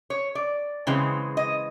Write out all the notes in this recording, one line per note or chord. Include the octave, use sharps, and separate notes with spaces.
C#5
D5
C#3 E3 G#3 C4
D#5